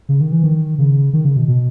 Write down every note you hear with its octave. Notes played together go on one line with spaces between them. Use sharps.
C#3
D#3
E3
D#3
C#3
D#3
C#3
B2
B2